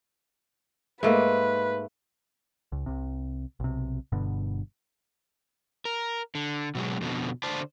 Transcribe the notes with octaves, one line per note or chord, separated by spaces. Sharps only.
G#2 A3 A#3 B4
C#2
C2 C3
B1 C3
G1 G2 B2 D3
A#4
D3
B2 F#3 G#3
F2 B2 D3
D3 C5 D5 A5